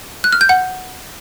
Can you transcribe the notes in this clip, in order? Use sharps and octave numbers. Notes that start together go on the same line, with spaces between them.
F#6
F6
G6
F#5